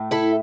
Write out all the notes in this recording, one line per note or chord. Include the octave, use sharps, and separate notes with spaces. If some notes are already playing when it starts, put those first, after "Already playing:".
Already playing: A2 A3
E4 A4